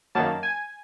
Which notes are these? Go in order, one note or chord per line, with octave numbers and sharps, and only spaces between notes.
F#2 D#3 F#3 A#3 A5
G#5